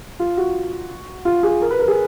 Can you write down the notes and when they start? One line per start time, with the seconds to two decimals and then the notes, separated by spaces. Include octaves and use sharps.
0.20 F4
0.37 F#4
1.25 F4
1.43 G#4
1.62 A#4
1.70 B4
1.80 A#4
1.88 G#4